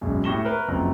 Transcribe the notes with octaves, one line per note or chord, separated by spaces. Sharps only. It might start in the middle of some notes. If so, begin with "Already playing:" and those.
E1 F#2
A2 G4 C#6 A#6 E7 G7
A#4 B4
F#1 F2 A#5